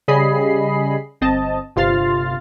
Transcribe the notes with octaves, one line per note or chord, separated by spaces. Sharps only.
C#3 G3 G#4 D#5 B5 C7
G1 C4 D#5 A5
G1 C3 F4 C6 F6 A6